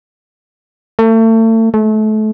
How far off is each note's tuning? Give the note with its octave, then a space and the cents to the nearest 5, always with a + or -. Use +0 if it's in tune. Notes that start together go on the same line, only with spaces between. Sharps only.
A3 +35
A3 -30